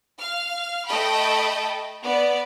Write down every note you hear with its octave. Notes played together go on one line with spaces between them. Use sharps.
F5 F6
A3 A4 D#5 G5 B5
B3 D5